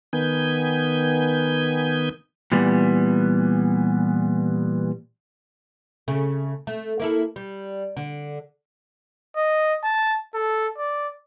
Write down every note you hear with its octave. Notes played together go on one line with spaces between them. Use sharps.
D#3 B3 G#5 G6
A#2 E3 G3 B3
C#3 A3
A3
A#3 E4 A4
G3
D3
D#5
A5
A4
D5